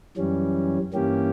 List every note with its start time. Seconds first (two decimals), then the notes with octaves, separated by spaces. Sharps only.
0.17 F#2 E3 G3 C#4
0.94 G2 E3 A#3 C#4 G4